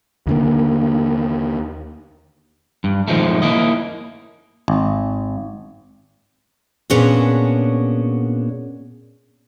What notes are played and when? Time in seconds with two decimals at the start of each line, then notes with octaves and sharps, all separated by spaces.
0.27 D#2 D3 A#3
2.84 G2
3.08 D#3 F3 G#3 A3
3.42 A#3 E4 D#5
4.68 G#1
6.90 A#2 B3 C#4 D4 F#4 G#4